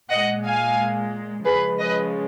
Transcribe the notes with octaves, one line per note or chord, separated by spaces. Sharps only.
A#2 G#3 D#5 F#5
F5 G#5
C#3 F3 G#3 G#4 B4
B4 D#5